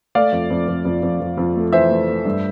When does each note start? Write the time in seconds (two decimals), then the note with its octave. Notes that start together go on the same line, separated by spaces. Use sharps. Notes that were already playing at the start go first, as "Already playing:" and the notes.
0.15 A3 D5 F5
0.32 F2
0.50 F2
0.68 F2
0.85 F2
1.03 F2
1.20 F2
1.38 F2
1.56 A3
1.73 E3 C5 E5
1.91 A3
2.08 A3
2.25 G2